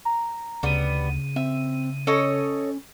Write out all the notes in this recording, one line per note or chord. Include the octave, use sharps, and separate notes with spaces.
A#5
D2 C#3 G3 B3 D#7
C4 E5
C#4 A4 C#5 D#5